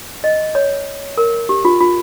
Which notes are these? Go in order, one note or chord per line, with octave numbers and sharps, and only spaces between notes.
D#5
C#5
A#4
G4
F4
F4